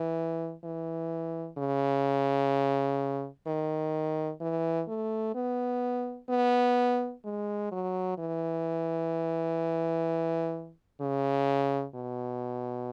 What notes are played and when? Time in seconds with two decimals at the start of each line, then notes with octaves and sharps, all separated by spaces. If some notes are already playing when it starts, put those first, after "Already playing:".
Already playing: E3
0.64 E3
1.58 C#3
3.47 D#3
4.41 E3
4.88 A3
5.35 B3
6.29 B3
7.25 G#3
7.72 F#3
8.18 E3
11.01 C#3
11.95 B2